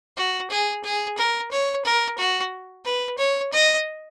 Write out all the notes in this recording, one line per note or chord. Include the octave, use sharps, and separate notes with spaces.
F#4
G#4
G#4
A#4
C#5
A#4
F#4
B4
C#5
D#5